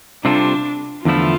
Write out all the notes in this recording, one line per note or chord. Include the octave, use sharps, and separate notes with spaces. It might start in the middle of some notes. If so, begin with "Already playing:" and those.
C3 G3 C4 D4 F4 A4
E2 D3 F3 A3 E4 F4